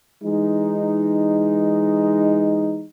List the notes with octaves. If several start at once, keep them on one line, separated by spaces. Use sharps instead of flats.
E3 G#3 D#4